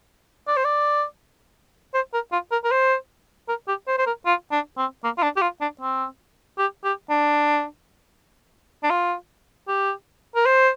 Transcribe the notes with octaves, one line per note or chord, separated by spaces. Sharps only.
D5
C5
D5
C5
A#4
F4
A#4
A#4
C5
A#4
G4
C5
C5
A#4
F4
D4
C4
A#3
F4
D4
G4
F4
D4
C4
G4
G4
D4
D4
F4
G4
A#4
C5